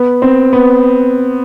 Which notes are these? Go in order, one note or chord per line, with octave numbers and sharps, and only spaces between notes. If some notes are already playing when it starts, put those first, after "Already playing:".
Already playing: B3
C4
B3